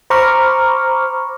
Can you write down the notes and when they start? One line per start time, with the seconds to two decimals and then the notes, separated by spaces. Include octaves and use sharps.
0.10 C5 A#5 B5 C#6 D6 F6